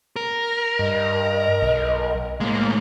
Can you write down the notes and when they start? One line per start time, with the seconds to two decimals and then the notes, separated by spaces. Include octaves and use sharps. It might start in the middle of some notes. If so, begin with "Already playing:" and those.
0.16 A#4
0.79 G2 D#5
1.62 B1
2.40 A2 G#3 A#3